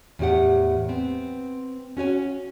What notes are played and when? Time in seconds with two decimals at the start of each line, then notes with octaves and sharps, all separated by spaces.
0.19 E2 A2 G4 F#5
0.89 B3 C4
1.97 C#4 F#4 C#5 G#5